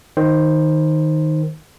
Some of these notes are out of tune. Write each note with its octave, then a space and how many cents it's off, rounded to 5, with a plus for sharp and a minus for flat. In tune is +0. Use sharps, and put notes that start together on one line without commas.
D#3 +0 C5 +10